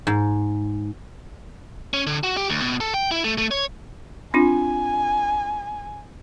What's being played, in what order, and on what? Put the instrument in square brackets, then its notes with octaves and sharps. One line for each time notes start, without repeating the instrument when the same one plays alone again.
[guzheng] G#2
[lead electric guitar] C#4
D3
F#4
G4
D2
B2
A4
G5
E4
A3
A3
C#5
[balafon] C4 D4 F4 [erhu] G#5